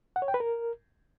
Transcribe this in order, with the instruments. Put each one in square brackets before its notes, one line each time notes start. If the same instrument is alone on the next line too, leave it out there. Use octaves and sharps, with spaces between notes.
[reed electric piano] F#5
C#5
G5
B4
A#4